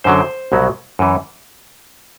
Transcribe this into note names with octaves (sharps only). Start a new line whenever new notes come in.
F#2 D3 F#3 C5
C2 B2 F#3
F#2 E3